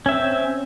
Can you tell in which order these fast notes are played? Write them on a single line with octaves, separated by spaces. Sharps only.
C#4 E5 C4